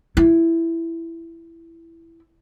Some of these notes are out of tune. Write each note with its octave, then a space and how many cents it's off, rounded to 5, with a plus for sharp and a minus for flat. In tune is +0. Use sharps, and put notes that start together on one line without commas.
E4 +10